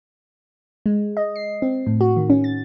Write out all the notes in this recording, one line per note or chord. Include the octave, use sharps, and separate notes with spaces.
G#3
D#5
C7
C4
A2
F#4
D#3
C#4
A6